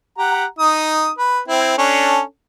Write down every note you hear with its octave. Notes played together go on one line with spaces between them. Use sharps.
G4 F#5 A#5
D#4 D#6
B4
C4 E4
C#4 D4 A4